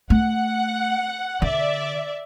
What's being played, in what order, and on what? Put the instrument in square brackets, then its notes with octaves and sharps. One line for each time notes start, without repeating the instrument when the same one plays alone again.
[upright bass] A3 [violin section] F#5
[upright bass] D3 [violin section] D5 E5